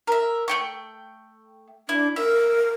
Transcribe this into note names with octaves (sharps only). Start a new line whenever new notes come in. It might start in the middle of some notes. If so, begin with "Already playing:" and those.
A#4 E5
A3 G5 C#6
D4 E4
A#4 E5